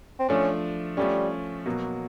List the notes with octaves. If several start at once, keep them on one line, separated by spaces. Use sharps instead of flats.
C4
F3 A3 C#4 D4
F3 G3 A3 C#4
B2 F#3 A#3